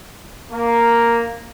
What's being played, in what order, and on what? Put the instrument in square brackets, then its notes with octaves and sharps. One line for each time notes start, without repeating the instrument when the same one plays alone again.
[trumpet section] A#3